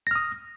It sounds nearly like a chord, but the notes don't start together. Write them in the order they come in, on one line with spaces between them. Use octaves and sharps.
A#6 F6 D#6